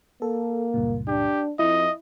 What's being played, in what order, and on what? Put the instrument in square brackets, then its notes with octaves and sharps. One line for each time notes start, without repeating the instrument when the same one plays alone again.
[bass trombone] A#3 [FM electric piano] A4
[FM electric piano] C#2 G2 A#2
[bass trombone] D4 [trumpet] G4
[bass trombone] F2 [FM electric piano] E4 [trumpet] D#5